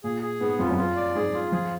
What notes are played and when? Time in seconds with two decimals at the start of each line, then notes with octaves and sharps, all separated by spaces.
0.04 A#2 G#4
0.22 G#4
0.40 G#2 B3
0.59 F2 F4
0.69 F#2
0.78 F4
0.96 D5
1.15 G#2 G#4
1.34 F4
1.52 F3 G#4